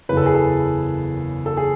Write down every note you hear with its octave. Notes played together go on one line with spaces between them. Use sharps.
F#1 E2 C#3 E3 B4
A4
G#4
A4
A4
G#4